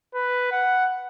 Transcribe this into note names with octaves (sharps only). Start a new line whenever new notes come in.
B4
F#5